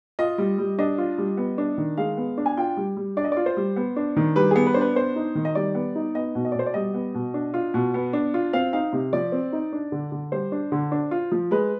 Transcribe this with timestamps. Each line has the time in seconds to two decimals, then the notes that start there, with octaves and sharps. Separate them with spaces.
0.19 F4 D#5
0.38 G3
0.58 G3
0.78 D4 D#5
0.98 F4
1.18 G3
1.37 B3
1.58 D4
1.78 D#3
1.97 G#3 F5
2.17 B3
2.38 D4
2.46 G#5
2.57 F4 G5
2.77 G3
2.97 G3
3.17 D4 D5
3.24 D#5
3.32 F4 D5
3.46 C5
3.57 G3
3.76 B3
3.96 D4
4.16 D#3
4.36 G3 B4
4.51 B3 G#4
4.66 B4
4.74 D4 C5
4.81 B4
4.95 B3 C5
5.16 D#4
5.35 D#3
5.45 D#5
5.55 G3 D5
5.75 B3
5.95 D#4
6.15 B3 D#5
6.35 B2
6.45 D#5
6.52 D5
6.55 B2 C5
6.66 D5
6.74 G3 D#5
6.94 B3
7.15 B2
7.34 D4
7.54 F4
7.74 B2
7.94 B3
8.13 D4
8.34 F4
8.53 C4 F5
8.73 D#4 F5
8.93 C3
9.13 F3 D5
9.32 C4
9.53 D#4
9.73 D4
9.92 D3
10.12 D3
10.32 G3 C5
10.52 D4
10.72 D3
10.92 D4
11.11 F4
11.32 F3
11.51 G#3 B4